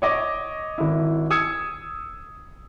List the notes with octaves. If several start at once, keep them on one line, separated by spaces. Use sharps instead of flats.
C#5 D#5 D6
G#1 E4
D#6 E6 G#6 C#7